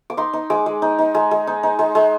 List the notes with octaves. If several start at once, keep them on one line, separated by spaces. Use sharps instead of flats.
D6
D#4 C6
D#4
G#3 D6
G#3
D#4
D#4
G#3
G#3
D#4
D#4
G#3
G#3